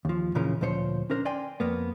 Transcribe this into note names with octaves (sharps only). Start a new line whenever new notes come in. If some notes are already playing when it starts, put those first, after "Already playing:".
D#2 F3
A#2 C#3 E3 F3 C#4 A#4
D2 A#2 F3 C5 C#5
C#4 D4 A#4 C5
D5 G5 G#5 C6
F2 A#3 B3